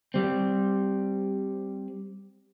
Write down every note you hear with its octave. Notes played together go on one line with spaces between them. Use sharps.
G3 C4